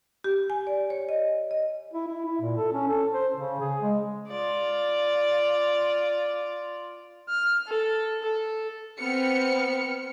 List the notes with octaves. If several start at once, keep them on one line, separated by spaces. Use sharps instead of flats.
G4
G#5
D5
C#5
D#5
D#5
E4
E4
E4
A#2
A4
C#4
A4
C5
C#3
G#4
G#3
F4 D5
F6
A4
A4
B3 C4 F6 C#7